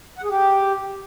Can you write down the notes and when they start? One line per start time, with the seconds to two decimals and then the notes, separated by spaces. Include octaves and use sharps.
0.18 F#5
0.23 G#4
0.29 G4